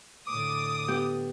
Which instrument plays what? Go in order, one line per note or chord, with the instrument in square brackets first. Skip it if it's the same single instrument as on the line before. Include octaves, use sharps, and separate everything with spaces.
[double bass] A2 D3 [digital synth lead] D6 [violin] D#6
[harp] B3 G4